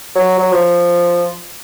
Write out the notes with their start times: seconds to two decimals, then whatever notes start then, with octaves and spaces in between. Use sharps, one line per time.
0.15 F#3
0.39 F#3
0.51 F3